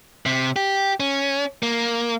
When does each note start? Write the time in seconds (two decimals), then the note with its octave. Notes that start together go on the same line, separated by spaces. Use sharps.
0.26 C3
0.56 G4
1.00 C#4
1.63 A#3